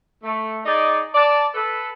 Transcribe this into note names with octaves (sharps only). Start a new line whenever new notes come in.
A3
D#4 G#4 D5
D5 A5
A4 B4